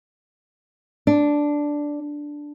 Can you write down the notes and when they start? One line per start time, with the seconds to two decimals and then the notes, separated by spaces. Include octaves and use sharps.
1.07 D4